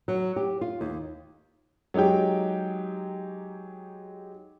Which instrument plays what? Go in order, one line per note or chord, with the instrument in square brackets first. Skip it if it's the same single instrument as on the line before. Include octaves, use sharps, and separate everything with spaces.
[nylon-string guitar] F#3
G4
F4
D#2
[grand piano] F#3 G#3 D#4 G4 G5